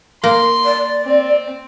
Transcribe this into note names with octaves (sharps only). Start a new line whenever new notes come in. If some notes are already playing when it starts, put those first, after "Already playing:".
A#3 C6
D5
C4